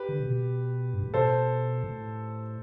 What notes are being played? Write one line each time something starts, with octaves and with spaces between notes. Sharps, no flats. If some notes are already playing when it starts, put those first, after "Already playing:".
Already playing: G4 B4
D3
C3
B2
G2
A2
B2 A4 C5
A2